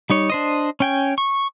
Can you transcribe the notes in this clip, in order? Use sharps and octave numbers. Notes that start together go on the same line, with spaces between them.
G3 D#4 C#5
D4 C5 D#5
C#4 G5 G#5
C#6